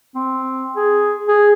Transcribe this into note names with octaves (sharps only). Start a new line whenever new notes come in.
C4
G#4
G#4